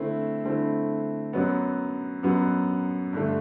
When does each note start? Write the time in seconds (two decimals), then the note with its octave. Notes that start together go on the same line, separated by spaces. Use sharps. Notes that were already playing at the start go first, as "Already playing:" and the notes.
Already playing: D3 A3 C4 E4
0.44 D3 A3 C4 E4
1.33 F#2 F#3 B3
2.23 F#2 F#3 B3
3.13 G2 D3 A3